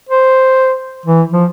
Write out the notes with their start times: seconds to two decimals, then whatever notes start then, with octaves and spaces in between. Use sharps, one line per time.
0.09 C5
1.06 E3
1.32 F3